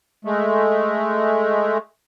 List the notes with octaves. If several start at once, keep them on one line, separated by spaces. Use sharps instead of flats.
G#3 A3